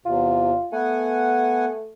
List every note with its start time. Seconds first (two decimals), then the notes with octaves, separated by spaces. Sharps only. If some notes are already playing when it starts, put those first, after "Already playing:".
0.05 E2 C3 F4
0.73 A3 B3 F#5 G#5